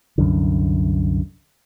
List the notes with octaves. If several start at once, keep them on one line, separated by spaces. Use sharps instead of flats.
C2 F#2 D3